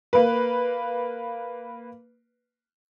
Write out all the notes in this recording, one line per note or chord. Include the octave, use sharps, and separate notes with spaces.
A#3 B4